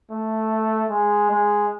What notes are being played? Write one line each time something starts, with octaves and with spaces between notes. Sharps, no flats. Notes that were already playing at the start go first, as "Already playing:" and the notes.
A3
G#3
G#3